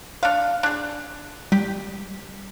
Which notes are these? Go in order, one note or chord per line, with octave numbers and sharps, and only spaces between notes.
D4 C#5 F5 C#7
D4 G#4
G3 G4